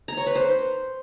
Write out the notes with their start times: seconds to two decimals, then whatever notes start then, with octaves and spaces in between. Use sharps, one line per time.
0.08 A#5
0.17 C#5
0.26 B4
0.35 C5